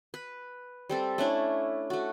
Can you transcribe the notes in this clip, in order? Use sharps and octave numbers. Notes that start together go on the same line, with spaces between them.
B4
G3 C4 A4
A3 C#4 D4 E4
A3 F#4